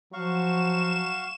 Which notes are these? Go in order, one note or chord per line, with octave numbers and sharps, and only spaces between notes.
F3 F#3 F#4 F5 C#6 E7